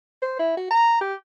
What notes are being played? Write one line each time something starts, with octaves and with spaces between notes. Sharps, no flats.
C5
E4
F#4
A#5
G4